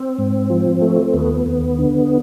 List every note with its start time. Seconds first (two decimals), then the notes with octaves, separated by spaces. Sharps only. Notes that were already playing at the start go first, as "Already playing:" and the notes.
Already playing: C4
0.18 G#2
0.50 F3
0.82 A3
1.14 D#2 B3
1.46 D#2
1.78 D3